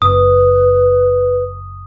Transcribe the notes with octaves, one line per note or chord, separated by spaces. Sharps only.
F#1 B4 D#6